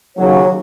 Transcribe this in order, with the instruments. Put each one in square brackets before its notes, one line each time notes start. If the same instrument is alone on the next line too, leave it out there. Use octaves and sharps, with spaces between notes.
[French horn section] D#2 C#3 F#3 [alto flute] C#5